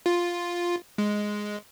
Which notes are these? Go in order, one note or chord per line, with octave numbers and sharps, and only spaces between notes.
F4
G#3